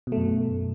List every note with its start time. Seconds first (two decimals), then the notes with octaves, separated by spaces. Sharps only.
0.07 B2
0.12 A3
0.17 F#2